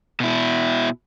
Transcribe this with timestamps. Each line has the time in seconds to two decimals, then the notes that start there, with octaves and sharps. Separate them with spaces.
0.20 B2 E4